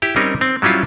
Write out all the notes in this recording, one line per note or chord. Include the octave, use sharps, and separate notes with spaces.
E4 G4
G3 C4 C#4 D#4 A#4
C4
F#3 G3 C#4 E4 F4